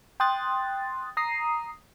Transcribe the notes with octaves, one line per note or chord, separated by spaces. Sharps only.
G5 C6 D#6 F#6 A6
A#5 D#6 C7